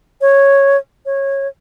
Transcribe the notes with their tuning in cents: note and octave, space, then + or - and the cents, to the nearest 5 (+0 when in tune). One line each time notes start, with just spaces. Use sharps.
C#5 -5
C#5 -15